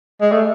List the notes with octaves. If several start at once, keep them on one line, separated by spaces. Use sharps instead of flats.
G#3
A3